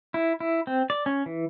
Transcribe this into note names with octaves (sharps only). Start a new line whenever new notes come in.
E4
E4
C4
D5
C#4
E3